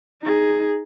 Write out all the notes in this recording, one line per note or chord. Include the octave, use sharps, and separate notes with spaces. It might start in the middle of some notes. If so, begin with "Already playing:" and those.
D#4 G#4